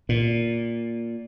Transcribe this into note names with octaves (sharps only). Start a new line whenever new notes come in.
A#2